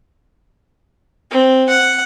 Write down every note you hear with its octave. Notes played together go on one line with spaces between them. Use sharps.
C4
F#5